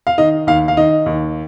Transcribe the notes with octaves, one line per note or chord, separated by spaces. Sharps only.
F5
D#3 D#5
D#2 F5
F5
D#3 D#5
D#2